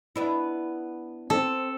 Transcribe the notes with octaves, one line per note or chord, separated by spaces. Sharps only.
B3 D4 E4
C4 A4